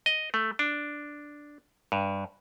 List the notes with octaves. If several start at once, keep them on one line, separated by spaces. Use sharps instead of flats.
D#5
A3
D4
G2